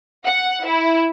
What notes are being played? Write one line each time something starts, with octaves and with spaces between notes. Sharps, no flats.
F#5
E4